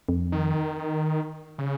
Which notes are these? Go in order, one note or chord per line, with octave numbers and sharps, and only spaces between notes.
F2
D#3
C#3